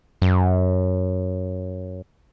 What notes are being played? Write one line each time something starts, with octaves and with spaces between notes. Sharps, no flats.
F#2